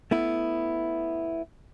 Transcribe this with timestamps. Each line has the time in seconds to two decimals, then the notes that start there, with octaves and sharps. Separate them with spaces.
0.11 A3 B3 E4